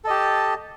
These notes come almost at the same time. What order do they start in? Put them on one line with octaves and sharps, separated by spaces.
A4 D#5 G4 A5